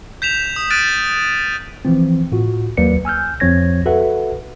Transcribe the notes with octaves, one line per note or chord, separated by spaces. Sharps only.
G6 B6 E7 F7
D#6
F6 F#6 A6 D7 D#7
E3 F3 C4
A2 F4 F#4
D#2 F#3 A#3 B4 D5 C#7
G#5 E6 F6 G6
F2 F3 C4 C#5 G#6 A#6
F#4 A4 B4 E5 F#5